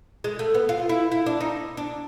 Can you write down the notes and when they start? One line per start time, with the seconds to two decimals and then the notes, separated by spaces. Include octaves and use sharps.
0.24 G#3
0.39 A3
0.54 B3
0.69 F4
0.89 E4
1.12 E4
1.26 D4
1.40 D#4
1.77 D4